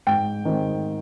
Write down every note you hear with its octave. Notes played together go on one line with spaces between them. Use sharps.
G#2 G5
D#3 G#3 C4